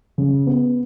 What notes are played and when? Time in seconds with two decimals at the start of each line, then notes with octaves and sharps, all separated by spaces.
0.18 C#3
0.47 B3